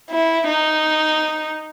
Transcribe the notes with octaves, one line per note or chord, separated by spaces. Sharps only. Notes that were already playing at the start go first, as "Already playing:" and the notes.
E4
D#4